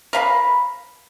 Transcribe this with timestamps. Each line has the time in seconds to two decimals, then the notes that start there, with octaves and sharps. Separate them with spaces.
0.13 A#4 B4 F5 B5